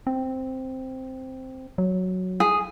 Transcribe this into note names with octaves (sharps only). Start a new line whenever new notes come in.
C4
F#3
G#4